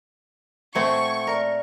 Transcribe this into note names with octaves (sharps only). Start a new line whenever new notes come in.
A#2 A3 C4 C5 F#5 C#6 G#6 C#7
A#4 D5 E5